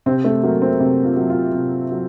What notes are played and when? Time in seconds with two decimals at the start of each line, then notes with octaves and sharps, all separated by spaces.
0.06 C3 C4
0.24 A3
0.43 F#3 A#3
0.62 C4
0.80 C3
1.05 F4
1.17 F#3
1.30 F4
1.54 C3
1.91 F#3